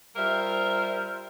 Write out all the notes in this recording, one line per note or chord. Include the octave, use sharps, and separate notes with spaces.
G3 F4 A#4 C5 E5